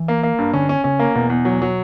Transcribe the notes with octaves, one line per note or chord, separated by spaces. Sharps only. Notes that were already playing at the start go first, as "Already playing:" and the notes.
Already playing: E3
A#3
A#3
G2
D3 C#4
C#4
C#3 C#4
A#3
E2 B2
E2
F#3
F#3